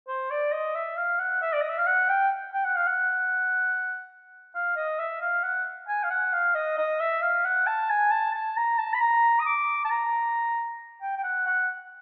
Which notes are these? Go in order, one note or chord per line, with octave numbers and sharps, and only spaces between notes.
C5
D5
D#5
E5
F5
F#5
E5
D5
D#5
E5
F5
F#5
G5
G5
F#5
F5
F#5
F5
D#5
E5
F5
F#5
G#5
F5
F#5
F5
D#5
D#5
E5
F5
F#5
A5
G#5
A5
A5
A#5
A5
B5
A#5
D#6
D6
A5
A#5
G5
G5
F#5
F#5